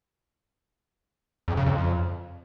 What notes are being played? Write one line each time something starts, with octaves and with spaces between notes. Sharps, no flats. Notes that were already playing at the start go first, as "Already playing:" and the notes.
F2
C#3
F2